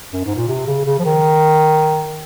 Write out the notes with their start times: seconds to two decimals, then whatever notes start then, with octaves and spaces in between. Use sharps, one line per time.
0.12 F#2
0.24 G#2
0.35 A#2
0.48 C3
0.66 C#3
0.85 C#3
0.99 F3
1.05 D#3